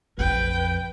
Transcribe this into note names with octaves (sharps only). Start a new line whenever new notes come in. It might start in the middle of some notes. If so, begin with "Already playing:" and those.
A#1 F2 B4 G5